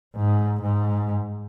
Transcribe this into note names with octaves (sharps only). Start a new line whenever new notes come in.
G#2
G#2